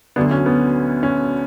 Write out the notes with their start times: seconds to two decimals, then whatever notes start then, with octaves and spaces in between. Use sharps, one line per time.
0.16 D2 D3 F#3 B3 D4
0.31 C#4
0.46 B3
1.03 C#4